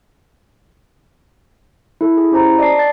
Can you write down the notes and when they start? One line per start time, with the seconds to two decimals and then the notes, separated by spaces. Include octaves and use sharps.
2.01 E4 A4
2.17 E4 G#4
2.32 C#4 G4 C5 A#5
2.59 D5 D#5 A5 C7
2.77 A5 A6